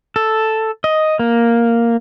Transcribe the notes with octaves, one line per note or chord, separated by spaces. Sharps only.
A4
D#5
A#3